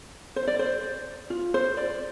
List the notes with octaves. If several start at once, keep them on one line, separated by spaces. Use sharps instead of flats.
C5
D5
C5
F4
C5
D5